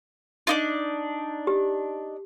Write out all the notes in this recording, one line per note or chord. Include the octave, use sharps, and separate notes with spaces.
D4 D#4 F4
G4